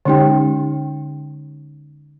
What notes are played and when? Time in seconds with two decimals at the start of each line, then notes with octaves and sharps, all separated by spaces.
0.05 D3 G#3 C#4 D#4 G4 G5